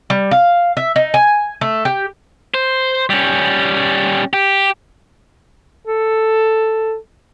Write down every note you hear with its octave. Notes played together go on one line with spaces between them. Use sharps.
G3
F5
E5
D#4
G#5
A3
G4
C5
G3 C#4
G4
A4